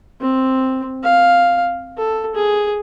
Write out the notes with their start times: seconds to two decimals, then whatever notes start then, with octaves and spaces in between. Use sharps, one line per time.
0.21 C4
1.03 F5
1.97 A4
2.35 G#4